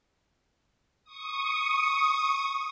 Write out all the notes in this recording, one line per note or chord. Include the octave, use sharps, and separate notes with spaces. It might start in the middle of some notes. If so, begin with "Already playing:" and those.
C#6 D#6